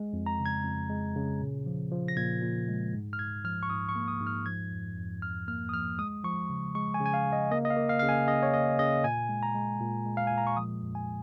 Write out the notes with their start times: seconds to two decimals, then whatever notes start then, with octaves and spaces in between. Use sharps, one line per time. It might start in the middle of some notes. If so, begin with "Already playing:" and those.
Already playing: G#3
0.13 F2
0.26 A#5
0.39 C#3
0.46 G#6
0.64 F2
0.89 G#3
1.15 C#3
1.40 A#2
1.66 F3
1.91 F3
2.08 A#6
2.16 A#2 G#6
2.42 A#2
2.68 G#3
2.93 G#2
3.13 F6
3.19 G#2 G#6
3.44 F3 F6
3.63 C#6
3.70 G#2 D#6
3.89 C#6
3.96 A#3
4.08 D#6
4.21 G#2
4.27 F6
4.46 F3 G#6
4.71 F2
4.97 F2
5.22 F2 F6
5.48 A#3 F6
5.69 D#6
5.73 F3 F6
5.99 G#3 D#6
6.24 F3 C#6
6.50 C#3
6.75 G#3 C#6
6.94 G#5
7.01 C#3
7.06 G#5
7.14 F5
7.26 C#3
7.32 D#5
7.51 A#3 D#5
7.65 D#5
7.70 F5
7.77 A#3
7.89 F5
7.99 C#3 F5
8.09 G#5
8.27 C#3 D#5
8.43 C#5
8.53 A#3 D#5
8.79 C#3 D#5
9.04 A#2 G#5
9.29 G#3
9.43 A#5
9.55 G#3
9.80 A#2
10.06 G#3
10.17 F5
10.27 A#2 G#5
10.38 A#5
10.47 C#6
10.57 F3 D#6
10.82 F2
10.95 G#5